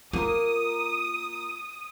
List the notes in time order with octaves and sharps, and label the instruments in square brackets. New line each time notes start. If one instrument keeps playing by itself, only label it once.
[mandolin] A#3 A#4 [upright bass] F4 [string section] D#6